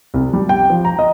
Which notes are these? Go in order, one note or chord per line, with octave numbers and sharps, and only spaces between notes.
C2
G3
G5
F3
A#5
D#5